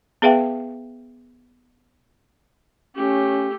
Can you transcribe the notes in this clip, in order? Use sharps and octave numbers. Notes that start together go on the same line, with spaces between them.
B3 G#4 B4 E5 F5 G5
A3 C#4 G4